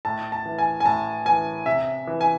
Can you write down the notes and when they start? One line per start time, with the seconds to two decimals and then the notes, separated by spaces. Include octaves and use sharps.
0.05 A2 A5
0.32 A5
0.46 E3
0.58 G#5
0.80 G#5
0.86 A2 A5
1.26 E3 G#5
1.66 C3 E5
2.07 E3
2.21 G#5